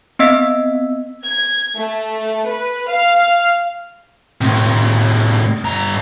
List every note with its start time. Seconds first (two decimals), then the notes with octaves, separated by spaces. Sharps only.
0.19 B3 C4 D#5 E6 B6
1.24 G#6
1.76 A3
2.46 B4
2.88 F5
4.41 A2 C3
5.65 G2 A#5